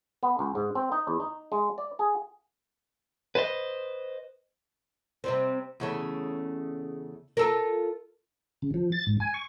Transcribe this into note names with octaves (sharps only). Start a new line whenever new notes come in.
B3
C#2
G#2
C4
D#4
E2
D#4
G#3
D5
G#4
B4 C5 D#5
C3 G3 C4
E2 C#3 A3
F4 A4 A#4
C#3
F3
A6
G#2
G#5
C#6